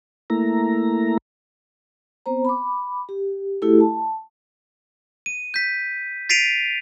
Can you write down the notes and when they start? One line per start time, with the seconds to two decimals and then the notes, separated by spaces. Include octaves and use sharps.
0.30 A3 A#3 E4 A#5
2.26 B3 C4 C5 A#5
2.45 B5 D6
3.09 G4
3.62 A3 E4 F#4 G4 A4
3.80 A5
5.26 D#7
5.54 G6 B6
6.29 A6 B6 C7 D7 D#7 F7